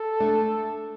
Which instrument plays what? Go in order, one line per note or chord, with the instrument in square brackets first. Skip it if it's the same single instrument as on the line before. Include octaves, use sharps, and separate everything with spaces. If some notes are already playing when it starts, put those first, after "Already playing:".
Already playing: [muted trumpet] A4
[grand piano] A3 D4